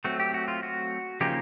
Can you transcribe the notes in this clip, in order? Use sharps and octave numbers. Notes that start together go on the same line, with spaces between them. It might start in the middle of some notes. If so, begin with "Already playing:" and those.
F#3 A3 C4 F#4
G4
F#4
F4
F#4
C#3 F3 A#3 D#4 G4